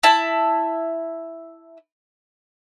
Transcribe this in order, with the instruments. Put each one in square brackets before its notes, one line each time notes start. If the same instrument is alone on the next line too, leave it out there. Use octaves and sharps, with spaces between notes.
[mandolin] E4 E5 A5